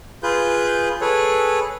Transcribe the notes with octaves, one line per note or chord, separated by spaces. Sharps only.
F4 G#4 B4 G6
G#4 A4 B4 C#5